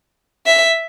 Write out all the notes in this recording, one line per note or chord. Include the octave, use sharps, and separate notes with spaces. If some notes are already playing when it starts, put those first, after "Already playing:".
E5